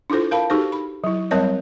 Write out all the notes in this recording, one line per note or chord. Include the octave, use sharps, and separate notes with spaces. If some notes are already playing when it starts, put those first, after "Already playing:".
D4 E4 F4 A4 C5
A#4 F5 A5 B5
D#4 F#4 G4 A4 C5
B5
F#3 E4
F#3 G3 C4 A#4 C#5 D#5